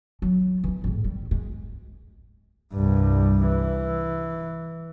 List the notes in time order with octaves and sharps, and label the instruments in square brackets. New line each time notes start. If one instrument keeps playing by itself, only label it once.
[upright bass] F#3
E3 D#4
G#1 A2
G3
G#3
[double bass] C2 G2
E3